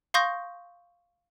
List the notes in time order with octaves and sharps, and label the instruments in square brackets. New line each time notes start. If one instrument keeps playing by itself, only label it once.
[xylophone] F5 C6 C#6 D#6 G6 A#6